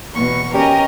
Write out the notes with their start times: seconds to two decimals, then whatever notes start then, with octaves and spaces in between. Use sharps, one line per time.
0.14 E2 B2 C#6
0.54 C#4 G4 A#4 D#5